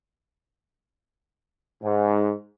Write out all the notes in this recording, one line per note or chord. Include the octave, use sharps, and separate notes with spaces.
G#2